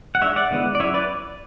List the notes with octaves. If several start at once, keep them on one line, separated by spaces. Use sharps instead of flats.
F#5
G#3 D4 C#5 E5
D5 F#5
D3 G#3 B3 E4
D5
F#3 C#4 E4 C#5 E5
B4 D5